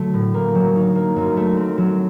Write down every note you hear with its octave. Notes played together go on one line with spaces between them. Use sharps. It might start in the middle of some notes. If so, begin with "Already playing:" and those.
Already playing: D3 F#3 A3
A2
A#3
F#3
D#4
A#3
F#2
A3
C4
F#3